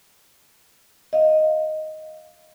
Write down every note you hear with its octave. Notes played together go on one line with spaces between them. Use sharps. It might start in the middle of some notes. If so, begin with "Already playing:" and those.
D#5 F5